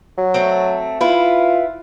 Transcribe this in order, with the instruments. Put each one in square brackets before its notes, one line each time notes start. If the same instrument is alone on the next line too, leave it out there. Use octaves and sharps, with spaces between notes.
[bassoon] F#3
[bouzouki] A3 C4
[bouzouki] E4 B4 [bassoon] F4